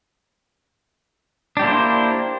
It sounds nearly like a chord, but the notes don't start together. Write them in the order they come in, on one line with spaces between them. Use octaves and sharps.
D4 G4 E4 A#3 C5